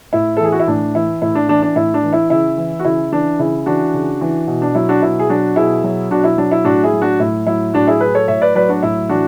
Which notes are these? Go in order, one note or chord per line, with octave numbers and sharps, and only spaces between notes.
A2 E4
A4
E3 G#4
F#4
E4
A2 D4
E3 E4
A2 E4
D4
E3 D4
D4
A2 E4
D4
E3
E4
C#3 E4
E3
F#4
C#3 E4
E3 D4
C#3 E4
E3 D4 F#4
C#3
E3
B2
D4
F#3 E4
D4 F#4
B2 E4
G#4
F#3 D4 F#4
B2 E4 G#4
F#3
B2 D4 F#4
E4
F#3 D4
E4
A2 D4 F#4
E4 G#4
F#3
D4 F#4
A2 E4
F#3 E4
A2 D4 F#4
E4 G#4
F#3 G#4 B4
A4 C#5
A2 C#5 E5
B4 D5
F#3 B4 D5
D4 F#4
A2 E4
E3 D4 F#4